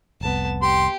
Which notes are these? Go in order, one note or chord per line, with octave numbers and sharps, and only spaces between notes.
F1 C2 B3 A5
G4 C6